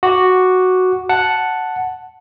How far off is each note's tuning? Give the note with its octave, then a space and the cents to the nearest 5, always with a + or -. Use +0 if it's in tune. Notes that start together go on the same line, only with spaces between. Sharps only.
F#4 +0 D6 +0
F#5 +0 A5 +0